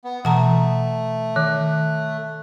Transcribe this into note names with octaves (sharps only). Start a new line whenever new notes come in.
B3
B2 E3 A3 F#5 A5 A#5
D#3 F#6